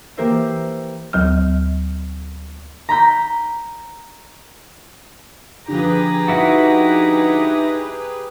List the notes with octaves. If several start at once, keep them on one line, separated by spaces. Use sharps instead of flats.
E3 A#3 G4 A#4 C5 E5
D2 F#3 F6
A#5 B5 G6
D3 F3 G4 G#4 B4 A#5
D#4 E4 F#4